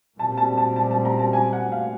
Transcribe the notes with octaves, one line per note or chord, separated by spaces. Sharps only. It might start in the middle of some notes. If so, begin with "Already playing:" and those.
A#2 G3 C4 A5
A5
A5
A5
A5
A#5
A5
G#5
F#5
F5